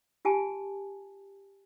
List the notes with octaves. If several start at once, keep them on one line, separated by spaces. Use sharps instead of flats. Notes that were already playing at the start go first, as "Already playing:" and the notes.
F4 G4 G#5 A5